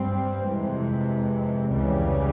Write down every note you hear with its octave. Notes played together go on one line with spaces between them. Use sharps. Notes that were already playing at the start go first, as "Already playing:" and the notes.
Already playing: G2 G3 C4
F2 C3 E3 G#3
C#2 C#3 E3 G3